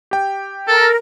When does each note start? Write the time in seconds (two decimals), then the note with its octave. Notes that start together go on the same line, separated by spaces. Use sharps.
0.11 G4 G5
0.68 A4 A#4